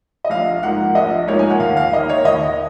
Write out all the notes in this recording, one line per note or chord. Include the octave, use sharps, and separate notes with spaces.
D#5
A#1 F5
G#2 F3 A#3 F#5
A#1 D#5
G#2 F3 A#3 C#5
G#5
F#5
D#2 F5
F5
D#3 A#3 D#5
C#5
D#2 D#5